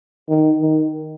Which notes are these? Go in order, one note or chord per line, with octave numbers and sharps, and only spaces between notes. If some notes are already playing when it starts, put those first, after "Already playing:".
D#3
D#3